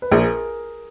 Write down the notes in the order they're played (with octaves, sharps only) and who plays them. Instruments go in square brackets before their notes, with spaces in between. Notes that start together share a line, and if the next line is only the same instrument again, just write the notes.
[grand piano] B4
[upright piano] A#1 [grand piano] G#4 A#4